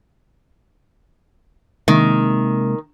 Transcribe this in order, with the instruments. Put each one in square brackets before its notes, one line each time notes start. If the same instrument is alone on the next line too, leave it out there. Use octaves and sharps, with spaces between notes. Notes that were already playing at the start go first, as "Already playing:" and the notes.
[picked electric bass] C3 G#3 A#3 [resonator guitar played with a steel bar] D#3